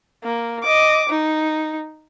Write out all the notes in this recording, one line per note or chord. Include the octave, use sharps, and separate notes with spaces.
A#3
D#5 D6
D#4